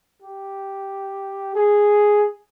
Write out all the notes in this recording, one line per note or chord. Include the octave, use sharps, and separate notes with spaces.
G4
G#4